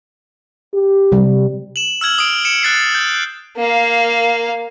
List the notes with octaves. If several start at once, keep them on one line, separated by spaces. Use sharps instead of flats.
G4
C3 G3
E7 F#7
E6 F6 G#6 F#7
D#6 D7
C#7 D7 E7 F#7
F#6 A6 C7
G6
A#3 F5